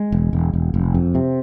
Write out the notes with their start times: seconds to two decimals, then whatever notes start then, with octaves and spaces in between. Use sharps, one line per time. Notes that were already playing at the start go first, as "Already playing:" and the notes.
Already playing: G#3
0.12 E1
0.33 E1
0.53 E1
0.74 F1
0.94 F2
1.15 C3